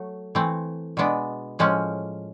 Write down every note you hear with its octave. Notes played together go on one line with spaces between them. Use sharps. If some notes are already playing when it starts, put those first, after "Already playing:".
Already playing: F#3 A3
E3 A3 C4
B2 G#3 B3 D4
A2 F3 G#3 C#4